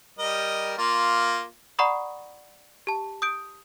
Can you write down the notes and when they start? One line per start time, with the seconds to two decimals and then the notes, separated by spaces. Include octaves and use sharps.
0.19 G3 A#4 D#5
0.78 A#3 F4
1.79 D5 F#5 A#5 B5 C#6 D#6
2.87 G4 A5
3.22 D#6 G6 D7